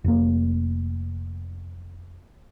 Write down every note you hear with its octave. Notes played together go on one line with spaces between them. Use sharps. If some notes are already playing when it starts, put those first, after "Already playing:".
F1 A#3